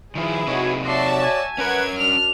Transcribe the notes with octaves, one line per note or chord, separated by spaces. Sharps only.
D#3 F3 E4 G#4 B4
C3 D#4 F#4 C#5
F#4 C#5 D5 E5 A5 C6
G#5
C#4 A#4 B4 F#5 G#6
F#2 D4 F6 F7